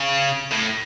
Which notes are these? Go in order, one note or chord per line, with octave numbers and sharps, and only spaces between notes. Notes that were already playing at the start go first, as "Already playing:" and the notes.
Already playing: C#3
A2